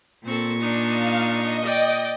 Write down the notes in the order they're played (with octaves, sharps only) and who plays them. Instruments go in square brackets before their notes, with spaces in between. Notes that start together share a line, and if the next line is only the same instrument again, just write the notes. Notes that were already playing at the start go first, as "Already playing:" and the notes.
[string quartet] A#2 C#6 [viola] C4 A4
[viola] D4 D#4
[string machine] F5
D#5
[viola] D5 G5